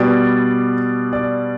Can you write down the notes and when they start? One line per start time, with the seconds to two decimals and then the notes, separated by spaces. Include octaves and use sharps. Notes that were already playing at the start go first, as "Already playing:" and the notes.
Already playing: B2 G3 D5
1.13 D5